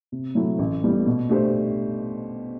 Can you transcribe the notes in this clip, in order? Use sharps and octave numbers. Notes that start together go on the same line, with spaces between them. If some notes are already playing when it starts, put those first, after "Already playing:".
C3
F#3 A3 E4
A1
A2 G3 B3
B2
A3 D4 G4 C5